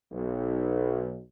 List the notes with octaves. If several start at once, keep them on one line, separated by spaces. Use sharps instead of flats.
B1